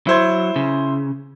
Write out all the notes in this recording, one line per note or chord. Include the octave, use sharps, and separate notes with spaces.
F#3 E4 C5 G#6
C#3